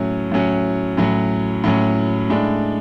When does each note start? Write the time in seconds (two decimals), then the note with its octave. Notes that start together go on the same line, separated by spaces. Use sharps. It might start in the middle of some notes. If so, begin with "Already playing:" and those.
Already playing: A2 F#3 C#4
0.31 A2 F#3 C#4
0.97 A2 F#3 C#4
1.64 A2 F#3 C#4
2.30 A2 G#3 D4